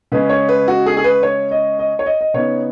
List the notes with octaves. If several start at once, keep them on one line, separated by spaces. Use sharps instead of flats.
C#3 G#3 C#4 B4
C#5
B4
F#4
G#4
G#4
B4
C#5
D#5
D#5
C#5
D#5
D#5
C#3 B3 D#4 C#5